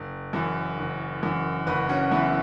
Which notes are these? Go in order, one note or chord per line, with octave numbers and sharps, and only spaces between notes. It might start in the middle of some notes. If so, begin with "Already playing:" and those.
Already playing: F#1
F#2 E3
F#1
F#2 E3
F#1 F#4 B4
C#4 F#4
F#2 E3 B3 E4